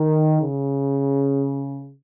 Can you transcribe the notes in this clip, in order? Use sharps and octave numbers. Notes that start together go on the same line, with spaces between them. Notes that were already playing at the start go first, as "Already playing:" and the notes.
Already playing: D#3
C#3